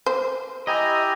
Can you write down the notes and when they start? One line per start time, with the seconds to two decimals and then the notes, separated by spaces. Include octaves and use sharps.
0.06 C5
0.67 E4 G4 D#5 G#5 A#5